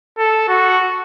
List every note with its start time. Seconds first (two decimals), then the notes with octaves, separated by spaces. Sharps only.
0.19 A4
0.48 F#4